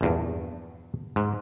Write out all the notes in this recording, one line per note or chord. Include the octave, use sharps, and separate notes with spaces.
A#1 E2 G2
G#2